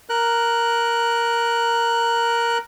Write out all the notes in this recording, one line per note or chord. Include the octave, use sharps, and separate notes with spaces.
A#4 F#6